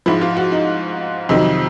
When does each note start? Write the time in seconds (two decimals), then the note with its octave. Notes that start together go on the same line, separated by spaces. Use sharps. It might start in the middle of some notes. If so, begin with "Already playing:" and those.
0.06 G#2 F3 E4
0.21 F4
0.37 F#4
0.52 D#4
1.29 F2 C3 D#3 F#3 D#4